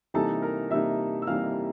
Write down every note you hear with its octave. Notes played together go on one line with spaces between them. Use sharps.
C3 E3 G3 A#3 D#4 A4 A5
A#4 A#5
C3 E3 G3 A#3 D#4 E5 E6
E6
C3 E3 G3 A#3 D#4 F5 F6